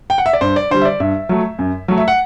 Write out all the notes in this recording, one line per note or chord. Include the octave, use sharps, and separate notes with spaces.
G5
F#5
E5
D5
G2 C5
D5
D3 G3 C5
E5
D5
G2 E5
F#3 A3
F#2
F#3 A3
E5
F#5